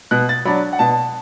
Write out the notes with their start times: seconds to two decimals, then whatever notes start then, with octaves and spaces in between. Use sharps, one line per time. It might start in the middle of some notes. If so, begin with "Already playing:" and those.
0.11 B2 F#6
0.29 A6
0.45 F#3 D4 B5
0.73 F#5
0.79 B2 A5